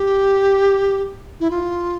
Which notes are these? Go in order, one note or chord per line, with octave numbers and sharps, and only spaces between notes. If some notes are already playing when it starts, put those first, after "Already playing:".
Already playing: G4
E4
F4